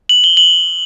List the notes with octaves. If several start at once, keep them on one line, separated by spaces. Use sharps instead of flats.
F#7
G7
F#7